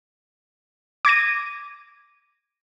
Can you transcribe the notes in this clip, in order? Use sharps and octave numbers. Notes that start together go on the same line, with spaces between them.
D6 G#6 A#6 D#7